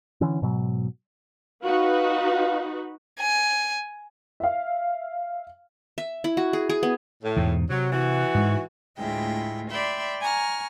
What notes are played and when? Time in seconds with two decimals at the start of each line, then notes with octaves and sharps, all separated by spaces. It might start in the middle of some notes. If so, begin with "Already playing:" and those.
0.21 D3 E3 C#4
0.42 G#2 B2 F#3
1.63 D#4 F#4 B4 F5
3.19 G#5
4.40 E5 F5
5.98 E5
6.24 E4
6.37 F#4
6.53 G#4
6.69 G#4
6.83 B3
7.24 A2
7.36 E2 G#2 B2
7.70 C3 F#3
7.92 E3 F#4
8.35 G#2 G#3
8.98 D2 A2 G#3 E4 F4 G5
9.71 D5 E5 G5 B5 C6
10.20 G#5 A#5 C#6 F6